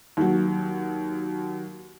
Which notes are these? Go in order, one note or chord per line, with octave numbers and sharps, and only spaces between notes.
D#2 F#3